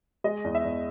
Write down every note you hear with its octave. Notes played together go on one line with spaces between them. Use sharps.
G#3 D#5
E2
E5
E2